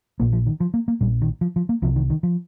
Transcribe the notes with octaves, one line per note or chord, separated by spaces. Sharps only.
A#1 A#2 A#3
F3
D#3
F3
A#3
A#3
A#1 A#2 G3
D#3
F3
F3
A#3
C2 C3 F3
D#3
D#3
F3